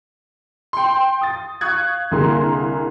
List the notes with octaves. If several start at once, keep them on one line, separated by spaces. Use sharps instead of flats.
G5 C6
D#6 A6
F5 C#6 D#6 F#6 G#6
C2 D3 A#3 G#4 A#4 C6